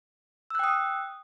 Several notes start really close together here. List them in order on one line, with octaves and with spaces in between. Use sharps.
E6 F#6 G5 D#6